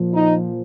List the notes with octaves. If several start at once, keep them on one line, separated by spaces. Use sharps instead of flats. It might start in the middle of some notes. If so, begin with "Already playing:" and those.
Already playing: A#2 F3
D#4